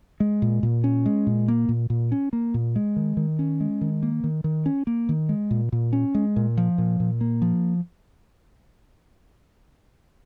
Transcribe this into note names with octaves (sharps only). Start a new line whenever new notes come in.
G#3
A#2
A#2
C#4
G#3
A#2
A#3
A#2
A#2
C#4
A#3
A#2
G#3
D#3
D#3
C#4
G#3
D#3
A#3
D#3
D#3
C#4
A#3
D#3
G#3
A#2
A#2
C#4
G#3
A#2
F3
A#2
A#2
A#3
F3